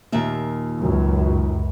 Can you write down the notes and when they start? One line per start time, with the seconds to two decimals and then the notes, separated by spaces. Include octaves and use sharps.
0.12 D#2 A#2 E5
0.79 C#2 F#2